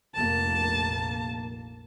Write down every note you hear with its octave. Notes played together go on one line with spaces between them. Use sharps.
F1 A#1 A#3 A5